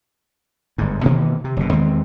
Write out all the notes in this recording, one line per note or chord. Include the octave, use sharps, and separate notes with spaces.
G1 G#2
B2 D#3 E3 A#3
C3
F#1 B2
E2 D#3 G#3 C4